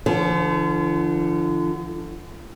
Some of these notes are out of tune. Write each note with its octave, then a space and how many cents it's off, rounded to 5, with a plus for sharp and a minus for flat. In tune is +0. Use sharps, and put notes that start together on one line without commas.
D3 +5 F3 -40